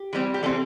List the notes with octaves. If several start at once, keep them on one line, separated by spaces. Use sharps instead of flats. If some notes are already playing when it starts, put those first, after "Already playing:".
Already playing: G4
E3 G3 C4
G4
E3 G3 C4 A4